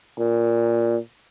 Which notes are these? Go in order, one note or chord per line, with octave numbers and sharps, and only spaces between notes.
A#2